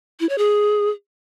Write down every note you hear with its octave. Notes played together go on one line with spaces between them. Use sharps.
E4
C#5
G#4